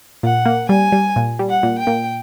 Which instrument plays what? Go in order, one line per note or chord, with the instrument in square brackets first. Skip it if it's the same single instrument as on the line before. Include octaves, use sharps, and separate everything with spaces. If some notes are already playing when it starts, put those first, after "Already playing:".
[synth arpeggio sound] A#2 [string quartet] F#5
[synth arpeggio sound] A#3
[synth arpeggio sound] G3 [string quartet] G#5
[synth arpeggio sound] G3
A#2
G3
[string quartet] F#5
[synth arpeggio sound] A#2
[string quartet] G5
[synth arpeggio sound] A#2